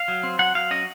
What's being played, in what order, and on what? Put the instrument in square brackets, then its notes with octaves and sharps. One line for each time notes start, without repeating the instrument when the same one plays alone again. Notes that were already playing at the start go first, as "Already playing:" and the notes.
Already playing: [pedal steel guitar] F5
F#3
C4
F#3 F#5
F#3 F5
C#4 D#5